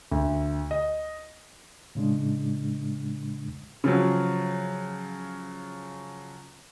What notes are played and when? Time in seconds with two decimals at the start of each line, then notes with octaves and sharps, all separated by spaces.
0.11 D2
0.71 D#5
1.95 A2 C#3 G#3 D4
3.84 C#3 F3 F#3